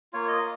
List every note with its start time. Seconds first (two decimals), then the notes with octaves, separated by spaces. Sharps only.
0.13 A#3 F4 C#5
0.28 D#5